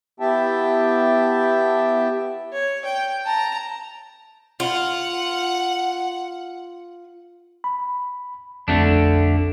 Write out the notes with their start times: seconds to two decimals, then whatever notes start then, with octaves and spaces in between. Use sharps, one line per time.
0.20 B3 E4 G4 E5 G5 A5
2.52 C#5
2.85 G5
3.26 A5 A#5
4.60 F4 F#5
7.64 B5
8.68 A#1 F2 D3 A3 D4